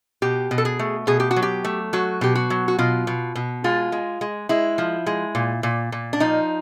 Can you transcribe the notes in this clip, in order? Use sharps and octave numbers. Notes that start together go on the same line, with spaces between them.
B2 G4
B2
A4
G#4
A3
B2 G#4
G4
F#4
F#3
G4
A3
F#3 F#4
B2 G4
F#4
F#3
F#4
B2 F4
B2
B2
G#3 F4
G#3
G#3
G#3 E4
F3
G#3
A#2
A#2
A#2
D4
F3 D#4